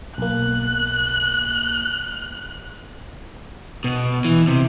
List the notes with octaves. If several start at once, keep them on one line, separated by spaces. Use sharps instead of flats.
B1 A#3 F#6
B2
E3
C3